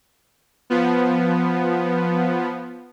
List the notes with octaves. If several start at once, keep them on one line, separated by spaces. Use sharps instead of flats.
F3 B3